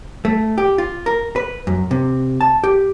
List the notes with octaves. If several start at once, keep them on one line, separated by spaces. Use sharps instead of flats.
A3
G4
F4
A#4
B4
F#2
C3
A5
G4